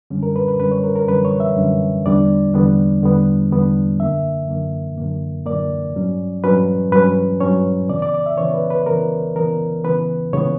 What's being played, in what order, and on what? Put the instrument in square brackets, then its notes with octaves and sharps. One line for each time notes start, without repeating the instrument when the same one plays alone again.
[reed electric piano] F#2 D3 G3 C#4
A#4
B4
B4
F#2 D3 G3 C#4 B4
C#5
A#4
A#4
F#2 D3 G3 C#4 B4
C#5
E5
F#2 D3 G3 C#4
E2 D3 G3 B3 D4 D5
E2 D3 G3 B3 D4
E2 D3 G3 B3 D4
E2 D3 G3 B3 D4
F#2 D3 A#3 E5
F#2 D3 A#3
F#2 D3 A#3
F#2 D3 A#3 D5
G2 F#3 C#4
G2 F#3 C#4 B4
G2 F#3 C#4 B4
G2 F#3 C#4 C#5
C#2 C#3 E3 B3 D5
D5
D5
E5
C#2 C#3 E3 B3 C#5
B4
B4
C#2 C#3 E3 B3 A#4
C#2 C#3 E3 B3 A#4
C#2 C#3 E3 B3 B4
C#2 C#3 E3 B3 C#5